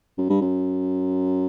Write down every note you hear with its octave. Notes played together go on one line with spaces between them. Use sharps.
F#2
G2
F#2